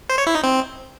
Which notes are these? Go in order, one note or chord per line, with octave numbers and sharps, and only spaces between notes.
C5
C#5
E4
D#4
C4